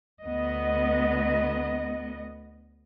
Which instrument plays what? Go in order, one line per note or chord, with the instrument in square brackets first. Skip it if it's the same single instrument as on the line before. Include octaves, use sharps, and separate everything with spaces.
[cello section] D2 B3 D#5